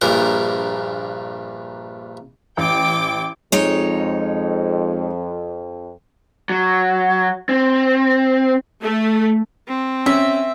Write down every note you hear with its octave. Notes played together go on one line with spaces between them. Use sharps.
A#1 G2 A#2 A#4
A1 G5 D6
F2 G#3 D#4 C#5
F#3
C4
A3
C4
C#4 E5